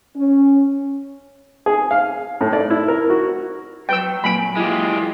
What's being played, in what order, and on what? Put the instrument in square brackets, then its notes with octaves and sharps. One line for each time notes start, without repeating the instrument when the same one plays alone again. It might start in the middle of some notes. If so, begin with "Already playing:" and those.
[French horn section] C#4
[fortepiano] G#4
F5
A2
D5
E4
A#4
F#4
[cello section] F#3 [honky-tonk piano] B4 [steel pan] G5 E6
[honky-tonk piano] A#2 G#5 D7 [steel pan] B5
[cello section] E3 F4 [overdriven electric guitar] G#3 G4 [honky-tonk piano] E4